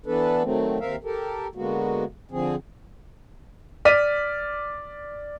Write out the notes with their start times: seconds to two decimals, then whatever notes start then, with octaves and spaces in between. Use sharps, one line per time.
0.06 E3 B3 D4 A4 B4
0.43 D#3 F#3 A3 C4
0.80 D#2 C4 A#4 E5 F5
1.04 G4 A4 A#4
1.55 D3 G#3 A#3 B3 F#4
2.31 D3 F3 C4 G#4
3.85 D5 F6 B6 D#7